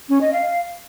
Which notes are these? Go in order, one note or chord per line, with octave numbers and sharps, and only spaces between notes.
C#4
D#5
F5